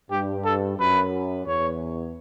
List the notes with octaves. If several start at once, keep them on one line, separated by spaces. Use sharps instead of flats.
G2 G4
A4
F#2 B4
E2 C#5